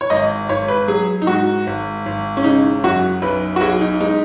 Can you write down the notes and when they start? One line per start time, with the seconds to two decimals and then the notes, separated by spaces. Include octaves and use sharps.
0.01 C#5
0.10 G#1 D#5
0.49 G#1 C#5
0.68 B4
0.88 F#3 G#4
1.22 D#4
1.27 G#2 F#4
1.67 G#1
2.06 G#1
2.37 C#4
2.44 C#3 D#4
2.83 F#2 F#4
3.22 B1 B4
3.56 F#4
3.61 B1 G#4
3.81 D#4
4.00 G#3 D#4